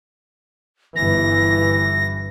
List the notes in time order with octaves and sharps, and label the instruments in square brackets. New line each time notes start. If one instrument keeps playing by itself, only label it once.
[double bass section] G1 G2 E3 [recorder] A#6